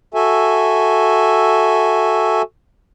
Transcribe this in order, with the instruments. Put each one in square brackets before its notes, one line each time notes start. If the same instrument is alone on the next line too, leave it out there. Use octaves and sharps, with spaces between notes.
[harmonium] F#4 A4 E5 G#5